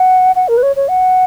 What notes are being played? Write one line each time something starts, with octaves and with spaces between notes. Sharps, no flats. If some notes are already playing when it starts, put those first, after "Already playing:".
Already playing: F#5
F#5
A#4
B4
C#5
C#5
F#5